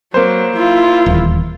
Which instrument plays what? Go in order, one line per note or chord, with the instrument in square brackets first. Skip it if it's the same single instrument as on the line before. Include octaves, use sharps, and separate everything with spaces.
[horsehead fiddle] F#3 [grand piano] A#3 C5
[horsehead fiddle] E4 F4
[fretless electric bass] D#1 E2